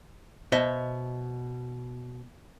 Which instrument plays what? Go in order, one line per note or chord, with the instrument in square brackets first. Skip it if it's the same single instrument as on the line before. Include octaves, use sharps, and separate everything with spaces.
[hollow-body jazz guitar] B2 C5 D#5 E5 A5